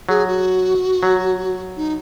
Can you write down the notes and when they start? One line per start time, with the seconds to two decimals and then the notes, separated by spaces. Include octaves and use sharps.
0.09 F#3 G#4
0.27 F#4
1.03 F#3
1.77 D#4